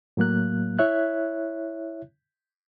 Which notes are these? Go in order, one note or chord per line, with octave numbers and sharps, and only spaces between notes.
A2 F#3 A#3 F#6
E4 C#5 E5 F#6